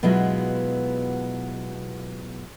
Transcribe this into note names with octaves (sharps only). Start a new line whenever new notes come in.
B2 F#3 G#3 B3 E4 F4